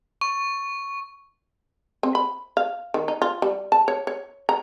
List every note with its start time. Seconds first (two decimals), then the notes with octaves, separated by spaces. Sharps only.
0.21 C#6
2.03 C4
2.15 B5
2.57 F5
2.94 D#3
3.08 D#4
3.22 F4
3.42 G3
3.72 A5
3.88 C#5
4.07 C#5
4.49 A#5